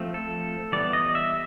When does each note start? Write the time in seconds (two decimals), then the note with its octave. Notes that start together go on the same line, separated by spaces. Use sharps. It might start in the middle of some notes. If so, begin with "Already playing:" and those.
Already playing: F3 A3 C4
0.14 A4
0.72 E3 G3 B3 D5
0.93 D#5
1.15 E5